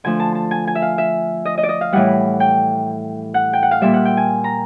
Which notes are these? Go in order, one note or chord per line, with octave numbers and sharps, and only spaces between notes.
D3 F3 A3 G#5
A5
A5
G#5
G#5
E5
F5
E5
D#5
D#5
D5
D#5
F5
A2 E3 G3 F#5
G5
F#5
G5
F#5
F5
A#2 G3 E5
F#5
G5
G#5
A#5